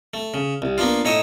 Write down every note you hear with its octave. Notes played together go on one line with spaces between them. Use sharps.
A3
C#3
C2
A#3 B3 D4 F4
A2 D#4 C#5 D#5 E5 D#6